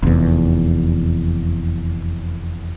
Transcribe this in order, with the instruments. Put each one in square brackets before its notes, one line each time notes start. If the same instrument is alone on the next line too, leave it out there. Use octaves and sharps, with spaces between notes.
[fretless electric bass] F1 E2